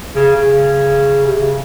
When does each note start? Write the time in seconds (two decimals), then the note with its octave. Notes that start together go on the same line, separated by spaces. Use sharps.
0.15 C#3
0.36 C#3
1.24 C3
1.36 C#3